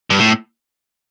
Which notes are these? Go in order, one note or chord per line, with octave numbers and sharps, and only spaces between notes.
G2
A2